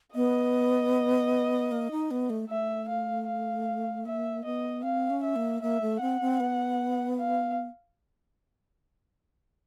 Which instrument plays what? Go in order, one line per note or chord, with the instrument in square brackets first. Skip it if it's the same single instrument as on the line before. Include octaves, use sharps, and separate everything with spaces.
[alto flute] B3 [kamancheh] D#5
[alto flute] A#3
D#4
B3
A3
[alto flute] A3 [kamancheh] E5
[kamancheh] F5
F5
[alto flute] A#3 [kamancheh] E5
[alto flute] B3 [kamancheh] D#5
[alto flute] C4 [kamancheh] F5
[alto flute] C#4
[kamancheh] E5
[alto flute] A#3
[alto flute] A#3 [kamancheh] E5
[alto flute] A3
[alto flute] C4 [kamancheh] F#5
[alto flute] C4
B3
[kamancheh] F5